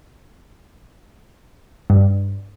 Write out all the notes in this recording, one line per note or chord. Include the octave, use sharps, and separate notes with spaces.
G2